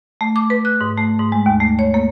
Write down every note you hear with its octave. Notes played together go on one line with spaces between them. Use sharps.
A3
D6
B4
F#6
G#2
A3
G#2
G#3
D#2
A3
C#5
A#3